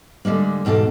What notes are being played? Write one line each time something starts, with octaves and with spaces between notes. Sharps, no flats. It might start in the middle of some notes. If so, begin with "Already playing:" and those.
D3 G3 G#3 A#3
E2 G#2 B2 A4 F5